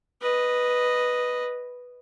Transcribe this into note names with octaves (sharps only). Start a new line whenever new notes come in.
B4 D#5